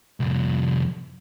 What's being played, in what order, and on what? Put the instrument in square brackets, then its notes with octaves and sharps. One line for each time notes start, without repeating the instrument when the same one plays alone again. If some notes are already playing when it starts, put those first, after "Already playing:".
[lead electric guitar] C2 F2